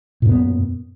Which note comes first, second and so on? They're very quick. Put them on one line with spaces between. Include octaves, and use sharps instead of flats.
A#2 F#2 B3